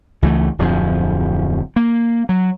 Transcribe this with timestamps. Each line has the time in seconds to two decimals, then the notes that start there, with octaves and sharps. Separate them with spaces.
0.22 C#2 E3 A3
0.59 D1 F2 F3
1.76 A#3
2.29 F#3